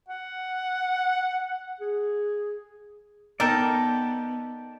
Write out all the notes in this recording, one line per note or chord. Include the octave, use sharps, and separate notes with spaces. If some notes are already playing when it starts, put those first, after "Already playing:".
F#5
G#4
B3 D#4 A4 A#4 D5 G5 A5